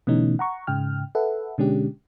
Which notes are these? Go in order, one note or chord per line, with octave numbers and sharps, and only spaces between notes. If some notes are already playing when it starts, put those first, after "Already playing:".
B2 D3 E3 A3 C#4 D#4
F#5 A#5 C#6
G#2 C#3 G5 F6
A4 B4 E5 F#5
B2 D3 G#3 C#4 D4 G4